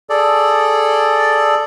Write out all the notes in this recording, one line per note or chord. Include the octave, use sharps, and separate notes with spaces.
G#4 A4 D5